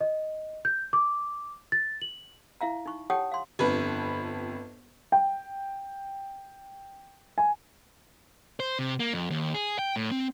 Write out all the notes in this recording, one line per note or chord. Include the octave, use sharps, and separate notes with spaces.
D#5
G6
D6
A6
F#7
E4 E5 F5 A#5
D#4 C#6
G4 C#5 F#5 G5 A5 D#6
F5 C6
G1 F2 B4
G5
G#5
C5
C3
A#3
F2
D#2
G#4
G5
A2
C4